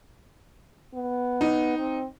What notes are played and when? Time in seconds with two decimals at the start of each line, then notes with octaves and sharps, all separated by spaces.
0.94 B3
1.41 D#4
1.78 C4